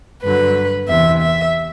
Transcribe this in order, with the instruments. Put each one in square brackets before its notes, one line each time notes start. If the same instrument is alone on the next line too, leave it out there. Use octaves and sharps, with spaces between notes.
[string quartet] G2 D3 F#3 B4
E2 C3 E3 E5
E5